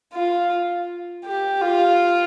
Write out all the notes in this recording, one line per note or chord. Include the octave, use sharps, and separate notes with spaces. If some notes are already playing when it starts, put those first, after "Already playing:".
F4
G4
F4